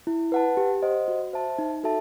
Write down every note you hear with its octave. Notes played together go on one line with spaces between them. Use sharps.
E4
B4 F#5 A5
G4
C5 D#5 F#5
F#4
C5 E5 A5
D#4
F#4 A4 E5 A5